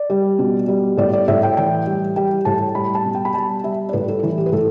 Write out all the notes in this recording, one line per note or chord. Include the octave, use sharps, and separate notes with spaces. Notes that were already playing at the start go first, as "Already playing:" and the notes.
Already playing: D5
G3
B2
G3
A2 D5
D5
A2 E5
G5
E3 G5
G3
G3 G5
A2 A5
G3 B5
A5
B2
G5
B5
G3 A5
G3 E5
D5
A2 B4
A4
E3
G4
B4
A2 A4